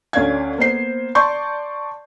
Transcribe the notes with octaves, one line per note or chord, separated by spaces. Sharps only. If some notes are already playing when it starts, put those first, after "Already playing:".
D2 C#4 D5 F5 G#6
A#3 B3 C5 C7
D5 A5 C6 C#6 G6